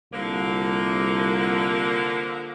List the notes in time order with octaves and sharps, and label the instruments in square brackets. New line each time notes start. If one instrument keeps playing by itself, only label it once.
[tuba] C2 [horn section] D3 F3 A#3